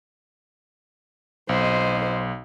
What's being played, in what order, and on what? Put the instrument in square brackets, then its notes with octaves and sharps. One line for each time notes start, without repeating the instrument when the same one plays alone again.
[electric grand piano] B1 [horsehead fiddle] C5 D#5